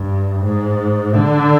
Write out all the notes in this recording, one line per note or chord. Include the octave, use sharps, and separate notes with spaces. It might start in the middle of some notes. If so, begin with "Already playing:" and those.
Already playing: G2
G#2
D3